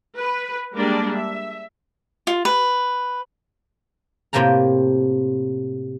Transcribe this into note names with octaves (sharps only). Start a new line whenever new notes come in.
B4
G3 G#3 A#3 D4 A#4 D5
E5
F4
B4
A2 C3 A#3 G5 A5 A#5